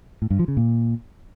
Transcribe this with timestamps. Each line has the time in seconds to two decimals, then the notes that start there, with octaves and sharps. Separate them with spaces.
0.22 A2
0.30 G2
0.39 F3
0.48 C#3
0.57 A#2